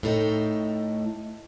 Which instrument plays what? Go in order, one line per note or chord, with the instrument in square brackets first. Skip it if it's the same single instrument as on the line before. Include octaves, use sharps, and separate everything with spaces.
[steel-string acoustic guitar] A2 A3 D#4 A4 G5